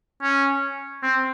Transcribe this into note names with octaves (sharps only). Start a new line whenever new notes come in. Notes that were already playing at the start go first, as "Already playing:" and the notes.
C#4
C4